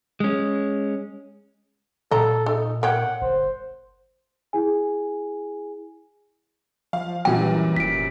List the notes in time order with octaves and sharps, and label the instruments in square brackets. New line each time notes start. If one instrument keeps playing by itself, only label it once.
[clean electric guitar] G#3 C#4
[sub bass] A#2 [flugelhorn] A4 [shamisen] D#5 A#5
[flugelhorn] D#4 [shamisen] A4
[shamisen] A#4 C#5 G5 [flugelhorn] F#5
[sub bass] G1 [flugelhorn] C5
[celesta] E4 G#4 G#5
[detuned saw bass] F3 [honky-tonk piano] F5
[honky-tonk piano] F#2 A#2 G3 [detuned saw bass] E3 [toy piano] G5
[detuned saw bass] F1 [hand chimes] B6 D7